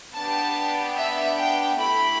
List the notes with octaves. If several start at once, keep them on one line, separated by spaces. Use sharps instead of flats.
B3 D4 G4 A5
E5
G5
A3 E4 G4 B5